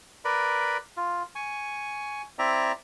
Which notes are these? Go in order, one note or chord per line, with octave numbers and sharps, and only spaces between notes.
A#4 B4 D5 B5
F4
G#5 C#6
C4 E4 D5 E5 A#5